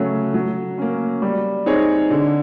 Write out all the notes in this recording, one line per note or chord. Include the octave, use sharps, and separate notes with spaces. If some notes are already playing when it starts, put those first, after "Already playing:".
Already playing: C#3 F#3 A3 C#4
F#3
A#3 C#4
G3
C4 D#4 G#4 C#5
D3